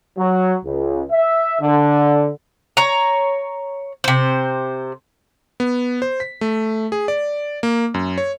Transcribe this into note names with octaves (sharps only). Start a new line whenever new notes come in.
F#3
C#2
E5
D3
C#5 A#5
C3 C5
B3
C5
B6
A3
G#4
D5
A#3
F#2
C#5